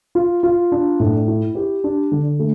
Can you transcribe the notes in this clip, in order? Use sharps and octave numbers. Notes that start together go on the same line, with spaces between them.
F4
F4
D4
A2
E4
G4
D4
D3
A3